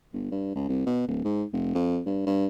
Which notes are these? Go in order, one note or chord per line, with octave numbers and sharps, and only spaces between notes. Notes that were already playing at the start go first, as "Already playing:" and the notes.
G1
G2
C#2
C2
B2
D1
G#2
F1
F2
G2
G2